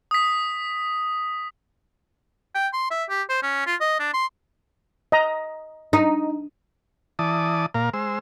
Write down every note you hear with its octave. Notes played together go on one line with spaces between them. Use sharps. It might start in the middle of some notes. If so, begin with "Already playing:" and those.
D#6 B6
G5
C6
E5
G4
C5
C#4
F4
D#5
D4
C6
D#5 A#5
D#4
E3 D5 A5 D#6
A#2 A#4 F5
G#3 C5 E6